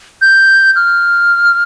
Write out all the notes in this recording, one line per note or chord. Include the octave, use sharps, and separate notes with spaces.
G6
F6